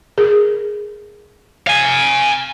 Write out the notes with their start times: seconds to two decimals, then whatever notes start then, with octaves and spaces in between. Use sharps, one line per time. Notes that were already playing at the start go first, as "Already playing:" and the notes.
0.18 G#4 A#4
1.67 F5 G#5